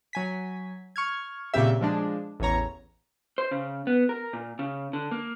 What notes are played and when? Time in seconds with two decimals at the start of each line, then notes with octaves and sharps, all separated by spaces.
0.13 F#3 G#5 B6
0.96 C#6 F6 G#6
1.54 A#2 C#3 C4 G4 E5
1.81 F3 G#3 D4
2.40 A1 E2 E3 C#5 A#5
3.38 C5
3.51 C#3
3.87 B3
4.09 A#4
4.33 A#2
4.59 C#3
4.93 D3
5.11 A#3